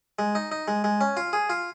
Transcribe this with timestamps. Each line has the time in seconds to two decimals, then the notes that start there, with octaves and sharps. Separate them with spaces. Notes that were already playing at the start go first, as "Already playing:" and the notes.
0.19 G#3
0.35 D#4
0.52 D#4
0.68 G#3
0.84 G#3
1.01 C#4
1.17 F4
1.33 G#4
1.50 F4